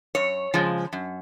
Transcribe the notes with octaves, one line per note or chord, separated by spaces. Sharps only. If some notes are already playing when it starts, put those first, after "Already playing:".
F#2 C#5
C#3 F3 G#3
F#2